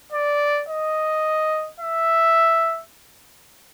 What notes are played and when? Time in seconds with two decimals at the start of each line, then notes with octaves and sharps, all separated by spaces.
0.12 D5
0.69 D#5
1.80 E5